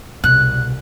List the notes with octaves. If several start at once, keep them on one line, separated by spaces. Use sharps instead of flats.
C2 B2 F#6